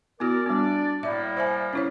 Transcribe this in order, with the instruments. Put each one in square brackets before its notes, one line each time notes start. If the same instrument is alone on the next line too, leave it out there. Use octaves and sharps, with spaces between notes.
[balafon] B3 E4 F#4 [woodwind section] A#4 D5
[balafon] G3 B3 [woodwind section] D4 D5
[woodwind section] A2 G3 A#3 [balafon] D5 E5
[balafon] C5 E5 G#5
C#4 E4 C#5